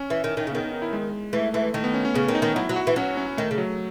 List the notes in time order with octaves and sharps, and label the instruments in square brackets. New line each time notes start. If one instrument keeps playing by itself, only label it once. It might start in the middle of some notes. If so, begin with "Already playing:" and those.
Already playing: [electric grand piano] C#4
[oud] E3
D#3
D#3
C#3
[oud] D#3 [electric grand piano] B3
[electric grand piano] D#4
E4
G#3
[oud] E3 [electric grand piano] A3
[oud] E3 [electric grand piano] A3
[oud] D#3 [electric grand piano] A3
[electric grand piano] B3
C#4
C#4
[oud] C#3 [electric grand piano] B3
[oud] D#3
[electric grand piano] D#4
[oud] D#3
[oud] F#3 [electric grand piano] E4
[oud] F#3
[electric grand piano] F#4
[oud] E3
[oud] F#3 [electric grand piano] C#4
[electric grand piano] C#4
[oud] D#3 [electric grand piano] A3
[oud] C#3
[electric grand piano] F#3